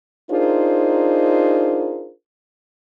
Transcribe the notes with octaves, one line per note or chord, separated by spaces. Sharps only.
D4 D#4 F4 G#4 A#4 C5